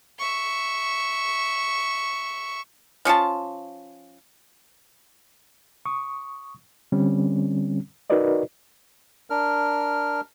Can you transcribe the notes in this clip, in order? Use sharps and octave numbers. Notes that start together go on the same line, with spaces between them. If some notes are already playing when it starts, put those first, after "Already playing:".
E5 C#6
F3 C#4 F4 A5
C#6 D#6
D3 G3 C4 C#4
D#4 F#4 A#4 B4 D5 D#5
D4 A#4 F6